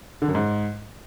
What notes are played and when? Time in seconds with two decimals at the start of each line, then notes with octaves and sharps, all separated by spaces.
0.22 D3
0.28 F#2
0.35 G#2